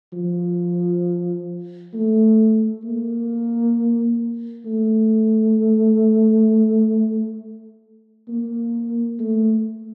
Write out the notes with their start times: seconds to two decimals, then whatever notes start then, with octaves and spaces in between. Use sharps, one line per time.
0.13 F3
1.94 A3
2.84 A#3
4.66 A3
8.28 A#3
9.19 A3